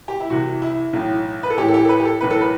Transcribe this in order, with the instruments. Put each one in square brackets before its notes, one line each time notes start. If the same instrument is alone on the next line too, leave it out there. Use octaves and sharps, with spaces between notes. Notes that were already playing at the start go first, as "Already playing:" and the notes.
[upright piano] G4
E4
C2 C3 E3 F#4
E4
B1 A2 E3
B4
A4
A1 A2 E3 G4
A4
G4
A4
B4
G4
A4
B1 A2 E3 B4
A4
B4